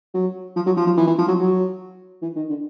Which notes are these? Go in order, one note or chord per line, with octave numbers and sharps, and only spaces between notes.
F#3
F3
F#3
F3
F3
E3
E3
F3
F#3
F#3
E3
D#3
D3